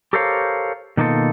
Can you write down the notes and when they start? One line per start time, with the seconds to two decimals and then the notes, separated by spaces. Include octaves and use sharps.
0.13 G4 A4 A#4 C5 C#5 F5
0.97 B2 D#3 A#3 D#4 F4 A4